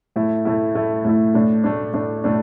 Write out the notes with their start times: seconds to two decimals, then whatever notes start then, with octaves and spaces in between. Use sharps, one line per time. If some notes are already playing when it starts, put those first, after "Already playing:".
0.16 A2 A3 E4
0.45 A2 A3 E4
0.75 A2 A3 E4
1.05 A2 A3 E4
1.34 A2 A3 D4
1.64 A2 A3 D4
1.94 A2 A3 D4
2.24 A2 A3 D4